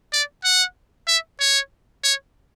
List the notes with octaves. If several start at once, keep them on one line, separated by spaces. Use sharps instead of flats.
D5
F#5
E5
C#5
C#5